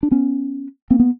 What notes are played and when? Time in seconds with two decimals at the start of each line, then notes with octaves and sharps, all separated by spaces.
0.03 D4
0.11 B3 C#4
0.90 A#3 C4
1.00 B3